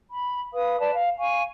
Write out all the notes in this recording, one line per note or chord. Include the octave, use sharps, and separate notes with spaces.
B5
B4 F5 D#6
B4 D5 A5
F5
F5 G#5 C#6